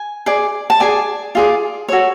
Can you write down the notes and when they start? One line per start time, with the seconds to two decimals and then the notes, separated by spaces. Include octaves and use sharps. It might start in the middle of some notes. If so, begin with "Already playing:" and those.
Already playing: G#5
0.26 G#4 D5
0.70 A5
0.80 G#4 D5 G#5
1.35 F4 G#4 D5
1.89 F#4 A4 C#5